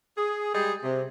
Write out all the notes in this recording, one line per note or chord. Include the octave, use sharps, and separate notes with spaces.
G#4
G3 G#3 G4 G#4
C3